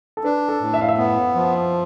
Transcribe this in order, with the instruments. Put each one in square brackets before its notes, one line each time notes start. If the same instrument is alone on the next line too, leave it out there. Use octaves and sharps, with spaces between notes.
[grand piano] A4
[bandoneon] D4 [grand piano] B4
[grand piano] A4
[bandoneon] A2
[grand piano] E5
F5
E5
[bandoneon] B3
F3